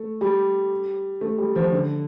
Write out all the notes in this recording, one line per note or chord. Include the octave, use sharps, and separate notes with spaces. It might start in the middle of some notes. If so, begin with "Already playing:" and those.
Already playing: A3
G3
A3
G3
F3
D3